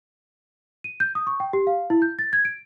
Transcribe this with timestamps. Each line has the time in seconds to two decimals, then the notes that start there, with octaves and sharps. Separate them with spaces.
0.84 D#7
1.00 G6
1.15 D#6
1.27 C#6
1.40 G5
1.53 G4
1.67 F5
1.90 E4
2.02 G6
2.19 A6
2.33 G#6
2.45 D7